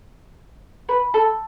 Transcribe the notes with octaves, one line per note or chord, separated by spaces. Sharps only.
B4
A4